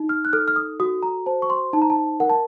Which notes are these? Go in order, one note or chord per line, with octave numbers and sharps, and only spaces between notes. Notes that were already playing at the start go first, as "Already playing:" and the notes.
Already playing: D#4
F6
F#6
A4 F6
F6
D#6
F#4 D#6
A#5
C5 A5
C#6
C6
D#4 A5
A#5
A5
A#4 F#5
A5